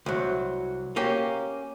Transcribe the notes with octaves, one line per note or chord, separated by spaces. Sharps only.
C2 F#3
A#3 C#4 G4